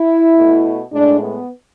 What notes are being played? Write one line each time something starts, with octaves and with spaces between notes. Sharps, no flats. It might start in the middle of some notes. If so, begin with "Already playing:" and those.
Already playing: E4
B2 A3
A2 G#3 D4
B3